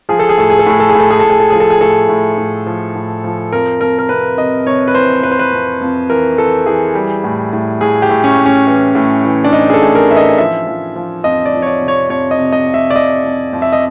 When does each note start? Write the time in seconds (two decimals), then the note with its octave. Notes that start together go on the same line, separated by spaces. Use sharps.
0.09 F3 G#4
0.19 A4
0.29 G#4
0.38 A2 A4
0.50 G#4
0.59 A4
0.66 A2 G#4
0.80 A4
0.90 G#4
0.95 A2 A4
1.10 G#4
1.19 A2 A4
1.30 G#4
1.40 A4
1.50 F3 G#4
1.60 A4
1.70 G#4
1.81 A2 A4
2.09 A2
2.38 A2
2.66 F3
2.95 A2
3.24 F3
3.52 F2 A#4
3.81 F2 A#4
3.99 A#4
4.09 C3 B4
4.38 C3 D#5
4.66 C3 C#5
4.88 B4
4.95 E3 C5
5.23 F2 B4
5.32 C5
5.39 B4
5.53 F2
5.81 F2
6.10 E3 A#4
6.38 E3 A4
6.66 E3 G#4
6.95 G3
7.24 A2
7.53 A2
7.81 A2 G#4
8.02 G4
8.09 A2
8.24 C#4
8.38 A2
8.46 C#4
8.67 E3
8.95 A2
9.24 E3
9.44 D4
9.52 E3 D#4
9.70 G#4
9.74 A4
9.82 A2
9.95 A#4
10.10 E3 E5
10.17 D#5
10.38 F3 E5
10.67 F3
10.96 F3
11.24 F2 D#5
11.46 D5
11.53 F3
11.62 C#5
11.67 D5
11.82 C3
11.88 C#5
12.10 F2 C#5
12.31 D#5
12.39 C3
12.53 D#5
12.67 F2
12.74 E5
12.91 D5
12.96 F2 D#5
13.24 F2
13.53 F2
13.62 E5
13.73 D#5